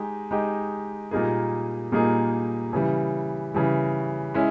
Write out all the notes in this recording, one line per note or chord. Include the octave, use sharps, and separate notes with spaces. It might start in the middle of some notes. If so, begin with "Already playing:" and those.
Already playing: G#3 D#4 G4
G#3 D#4 G4
A#2 G3 A#3 D#4 G#4
A#2 G3 A#3 D#4 G#4
C#3 E3 G3
C#3 E3 G3
G#3 C#4 E4